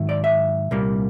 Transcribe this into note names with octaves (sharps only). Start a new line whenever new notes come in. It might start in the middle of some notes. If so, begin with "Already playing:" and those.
Already playing: G#2 D#3 F#3 E4
D5
E5
C2 A#2 G3 A#3